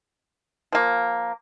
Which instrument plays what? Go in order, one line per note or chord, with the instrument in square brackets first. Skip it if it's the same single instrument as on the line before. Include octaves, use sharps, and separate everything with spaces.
[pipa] F3 A#3